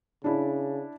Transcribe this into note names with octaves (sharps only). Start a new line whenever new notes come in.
C#3 D4 E4